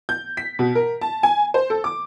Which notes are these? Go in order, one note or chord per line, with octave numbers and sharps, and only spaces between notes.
G6
B6
B2
A#4
A5
G#5
C5
A4
D6